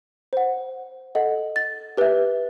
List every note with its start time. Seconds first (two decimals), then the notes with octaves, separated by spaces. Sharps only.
0.33 C5 F#5
1.15 A4 D#5 F#5
1.56 A6
1.97 G4 B4 E5